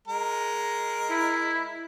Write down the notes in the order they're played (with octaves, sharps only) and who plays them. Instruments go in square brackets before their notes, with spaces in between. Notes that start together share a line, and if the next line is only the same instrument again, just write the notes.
[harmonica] G#3 A#4
[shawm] E4